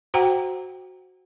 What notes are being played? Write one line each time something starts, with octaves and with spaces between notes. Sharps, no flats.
F#4 C5 F#5 G5 A#5